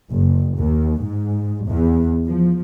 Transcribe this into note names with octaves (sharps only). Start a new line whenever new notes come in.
F#1
D#2
G#2
E2
F3